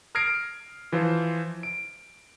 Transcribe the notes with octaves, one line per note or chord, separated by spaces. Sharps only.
D#6 F6 G#6 A#6 C7 D7
E3 F3 F4 C5
D7